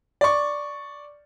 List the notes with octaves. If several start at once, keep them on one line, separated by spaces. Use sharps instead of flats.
D5 C#6